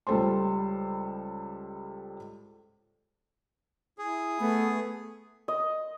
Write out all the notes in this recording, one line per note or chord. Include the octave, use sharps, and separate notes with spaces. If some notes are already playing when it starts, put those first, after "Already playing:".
C#2 G3 A4 C5 C6
E4 G#4
A3 B3
D#5